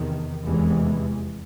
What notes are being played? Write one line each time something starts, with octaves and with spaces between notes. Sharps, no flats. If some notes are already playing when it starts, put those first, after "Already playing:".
Already playing: E2 C3 D#3
F1 E2 C3 E3 G#3